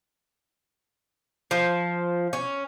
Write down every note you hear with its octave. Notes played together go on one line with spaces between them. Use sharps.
F3
C#4